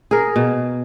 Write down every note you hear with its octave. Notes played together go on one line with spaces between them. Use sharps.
G#4 A#4
B2